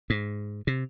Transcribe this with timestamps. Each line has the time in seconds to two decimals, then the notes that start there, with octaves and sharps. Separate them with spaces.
0.10 G#2
0.67 C3